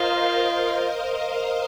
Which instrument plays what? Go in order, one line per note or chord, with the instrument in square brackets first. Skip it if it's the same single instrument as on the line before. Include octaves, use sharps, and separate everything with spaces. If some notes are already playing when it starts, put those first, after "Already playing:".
Already playing: [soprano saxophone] F4 [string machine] A#4 C5 D#5 F5